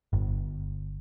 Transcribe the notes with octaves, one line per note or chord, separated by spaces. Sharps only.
G1